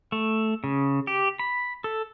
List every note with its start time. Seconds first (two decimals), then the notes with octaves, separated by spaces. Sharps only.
0.12 A3
0.64 C#3
1.07 G4
1.39 B5
1.84 A4